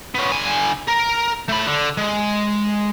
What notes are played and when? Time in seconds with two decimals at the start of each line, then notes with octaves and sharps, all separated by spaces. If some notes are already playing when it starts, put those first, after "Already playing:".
0.15 B3 C#4
0.32 D3 G#5
0.88 A#4
1.49 A3 B5
1.67 D3
1.97 G#3